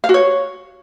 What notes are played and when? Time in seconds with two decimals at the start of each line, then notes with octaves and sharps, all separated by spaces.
0.04 F5
0.09 F#4
0.14 C#5